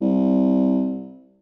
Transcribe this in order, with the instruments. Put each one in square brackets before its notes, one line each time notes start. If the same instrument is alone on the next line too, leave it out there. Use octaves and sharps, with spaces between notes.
[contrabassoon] C2